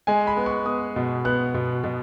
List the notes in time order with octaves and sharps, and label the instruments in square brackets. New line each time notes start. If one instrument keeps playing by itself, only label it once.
[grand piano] G#3 G#5
B5
B3
C#6
B3 D#6
B2
B3 F#6
B2
B2